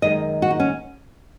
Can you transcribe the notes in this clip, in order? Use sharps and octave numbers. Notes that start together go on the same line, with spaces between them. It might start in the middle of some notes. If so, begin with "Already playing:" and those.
F#2 D#3 G#3 D#5
F#4
D#4
C#4